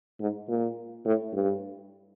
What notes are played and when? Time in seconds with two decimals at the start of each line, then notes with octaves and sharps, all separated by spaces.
0.20 G#2
0.49 A#2
1.05 A2
1.33 G2